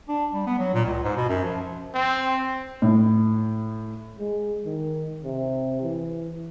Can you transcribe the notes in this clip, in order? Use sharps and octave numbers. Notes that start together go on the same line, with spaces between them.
D4
G3
B3
F#3
A#2
C#2
G#2
B2
F#2
F3
C4
A2
G#3
D#3
C3
E3